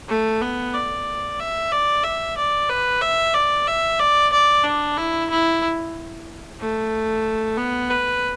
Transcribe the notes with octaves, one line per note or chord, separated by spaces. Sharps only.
A3
B3
D5
E5
D5
E5
D5
B4
E5
D5
E5
D5
D5
D4
E4
E4
A3
B3
B4